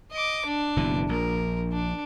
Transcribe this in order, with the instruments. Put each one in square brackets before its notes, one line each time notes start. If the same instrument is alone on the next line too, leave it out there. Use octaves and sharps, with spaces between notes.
[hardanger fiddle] D#5 D6
D4
[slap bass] F#1 B2 E3
[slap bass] A#1 [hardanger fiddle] A#4
[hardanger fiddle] D4